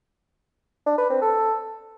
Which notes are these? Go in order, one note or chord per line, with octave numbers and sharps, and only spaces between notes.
D4
B4
C4
A4